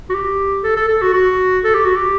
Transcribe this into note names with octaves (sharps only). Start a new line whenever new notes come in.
F#4
G4
A4
A4
A4
F#4
F#4
A4
G4
F#4
G4